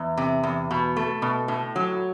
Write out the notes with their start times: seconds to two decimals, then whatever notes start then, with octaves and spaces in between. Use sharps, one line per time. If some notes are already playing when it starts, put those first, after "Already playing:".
Already playing: E2
0.17 C3
0.43 E2
0.71 B2
0.96 A3
1.22 B2
1.48 A2
1.76 F#3